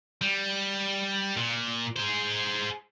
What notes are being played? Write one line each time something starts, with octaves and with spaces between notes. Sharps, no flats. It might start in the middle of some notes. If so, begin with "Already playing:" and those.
G3
A#2
G#4 C5